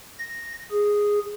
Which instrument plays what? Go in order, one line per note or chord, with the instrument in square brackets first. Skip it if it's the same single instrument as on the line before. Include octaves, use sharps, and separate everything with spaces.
[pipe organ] A#6
G#4